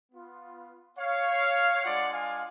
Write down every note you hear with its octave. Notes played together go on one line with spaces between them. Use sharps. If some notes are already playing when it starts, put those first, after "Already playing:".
B3 F4
C#5 F5
G#3 D4 F4 D5 F#5
F5 G#5